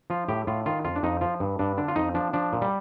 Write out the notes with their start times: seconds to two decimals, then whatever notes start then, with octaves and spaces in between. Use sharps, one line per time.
0.10 F3 F4
0.28 A2 G4
0.47 A2 F4
0.66 D#3 F4
0.85 F2 F4
0.96 D4
1.03 F2 D#4
1.21 F3 F4
1.40 G2
1.59 G2 D4
1.77 D3 D4
1.88 F4
1.96 F2 D#4
2.14 F3 D4
2.33 F3 D4
2.53 A#2
2.62 G3